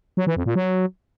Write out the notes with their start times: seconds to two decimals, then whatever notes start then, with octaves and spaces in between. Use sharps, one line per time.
0.17 F#3
0.27 E3
0.36 F2
0.46 A#2
0.55 F#3